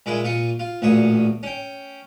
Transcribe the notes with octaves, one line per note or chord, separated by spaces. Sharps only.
A#2 G#3 E4 G#4
A#2 F4 C#6 D#6
F4
A1 D2 A#2 G#4 C#6 D#6
C#4 G5